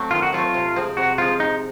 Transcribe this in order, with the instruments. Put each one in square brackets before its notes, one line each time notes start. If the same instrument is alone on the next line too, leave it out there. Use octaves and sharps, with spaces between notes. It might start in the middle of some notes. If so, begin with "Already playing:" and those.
Already playing: [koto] F#3 A3 C4
[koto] D#3 [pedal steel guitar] F4
[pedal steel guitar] F#4
[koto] F#3 A3 C4 [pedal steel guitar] F4
[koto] C3
F3 G#3 C4
[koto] C3 [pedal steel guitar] F#4
[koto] F3 G#3 C4 [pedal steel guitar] F4
[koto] C3 [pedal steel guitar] D#4